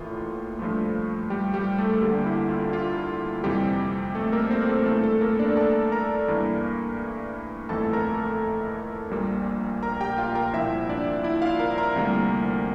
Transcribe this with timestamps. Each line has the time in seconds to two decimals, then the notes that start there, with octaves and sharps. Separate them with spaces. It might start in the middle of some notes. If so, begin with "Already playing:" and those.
Already playing: A1 A2 E3 A#3 F4
0.59 G2 F3 A3
1.30 G3 G4
1.54 G3 G4
1.78 A3 A4
2.01 D2 D3 G3 A#3 G4
2.26 E4
2.49 F4
2.73 F4
3.44 F2 C3 E3 G3 G4
4.15 A3 A4
4.32 A#3 A#4
4.49 C4 C5
4.67 A3 A4
4.79 A#4
4.85 G2 E3 A3 A4
5.03 A3 A4
5.21 A#3 A#4
5.39 D4 D5
5.57 A4 A5
5.92 A#4 A#5
6.28 G2 E3 A#3
7.69 G1 F2 E3 A3 A4 A5
7.93 A#4 A#5
9.11 A#1 A#2 G3 A#3
9.83 A#4 A#5
10.01 G4 G5
10.18 F4 F5
10.35 A#4 A#5
10.53 C2 A#2 F3 E4 E5
10.89 D4 D5
11.24 E4 E5
11.42 F4 F5
11.59 A#4 A#5
11.78 A#4 A#5
11.96 D2 C3 E3 G3 A#3